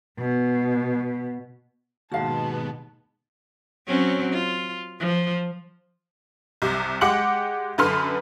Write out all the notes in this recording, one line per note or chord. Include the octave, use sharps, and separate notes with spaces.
B2
D#2 G#2 B2 B3 F#4 F5 F#5 A5
F#3 C4 C#4
F4
F3
C2 C3
G#3 G4 F#5 D6 C#7 F#7
F#2 D3 A4 B4 C6 F6